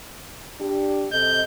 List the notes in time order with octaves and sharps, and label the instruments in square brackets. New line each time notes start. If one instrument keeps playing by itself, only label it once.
[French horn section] D4 G4
[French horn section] C3 A4 D#5 [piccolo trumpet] G6